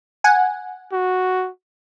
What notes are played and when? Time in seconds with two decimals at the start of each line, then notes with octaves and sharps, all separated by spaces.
0.24 F#5 G#5
0.93 F#4